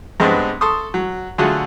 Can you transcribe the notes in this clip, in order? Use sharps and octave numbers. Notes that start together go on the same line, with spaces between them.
G2 G#3 B3 C4 D4
A4 C6 C#6 D#6
F#3
D3 F#3 A3 F4 F#4 G#4